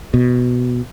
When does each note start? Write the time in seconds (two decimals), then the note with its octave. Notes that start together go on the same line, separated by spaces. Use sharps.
0.14 B2